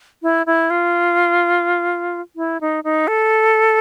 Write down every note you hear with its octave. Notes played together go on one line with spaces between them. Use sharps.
E4
E4
F4
E4
D#4
D#4
A4